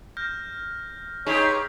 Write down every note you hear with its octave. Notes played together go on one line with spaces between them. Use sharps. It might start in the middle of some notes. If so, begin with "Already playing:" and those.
F6 G6 A#6
D#4 G4 G#4 C#5